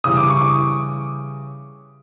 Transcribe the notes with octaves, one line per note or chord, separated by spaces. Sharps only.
C#3 E3 G3 D#6
D6
C#6
D6